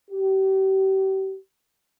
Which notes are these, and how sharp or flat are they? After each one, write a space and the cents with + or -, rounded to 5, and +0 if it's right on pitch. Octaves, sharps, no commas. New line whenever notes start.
G4 -35